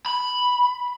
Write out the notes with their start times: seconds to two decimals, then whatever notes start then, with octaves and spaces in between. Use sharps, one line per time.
0.06 B5